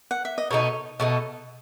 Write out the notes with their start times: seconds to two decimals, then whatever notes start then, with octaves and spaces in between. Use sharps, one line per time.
0.11 F#5
0.25 E5
0.38 D#5
0.51 B2 A3 D#4 C#5
1.00 B2 A3 D#4